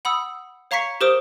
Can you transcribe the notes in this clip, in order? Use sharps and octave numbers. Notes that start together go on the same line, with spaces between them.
F#5 B5 D#6 E6
C#5 F5 A#5 C#6 B6 C#7
G4 A#4 C5 D#6 D7 G7